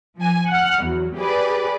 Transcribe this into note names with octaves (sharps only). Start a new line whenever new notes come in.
F3 G#5
F#5 F6
E2 F#3
G4 G#4 B4 D5